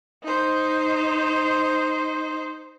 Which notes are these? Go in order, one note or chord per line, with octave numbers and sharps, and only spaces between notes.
D#4 C5